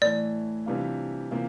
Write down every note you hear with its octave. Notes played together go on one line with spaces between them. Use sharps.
A2 E3 A3 D5
C3 E3 G3 D4 F4
C3 E3 A#3 F4